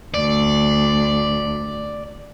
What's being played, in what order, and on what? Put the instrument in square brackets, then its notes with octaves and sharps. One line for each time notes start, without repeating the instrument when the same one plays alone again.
[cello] D2 [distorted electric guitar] D5